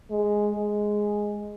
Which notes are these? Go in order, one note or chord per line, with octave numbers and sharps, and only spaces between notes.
G#3
G#3